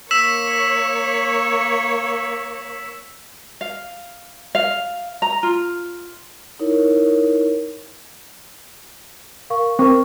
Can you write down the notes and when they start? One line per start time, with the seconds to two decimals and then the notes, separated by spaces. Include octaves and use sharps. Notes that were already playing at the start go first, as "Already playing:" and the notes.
0.11 A#3 C#5 E6 B6 E7
3.61 F5
4.55 F5
5.22 A#5
5.43 F4
6.59 D#4 E4 A#4 C#5
9.50 A#4 F5 C#6
9.79 C4 A#4 C5 C#6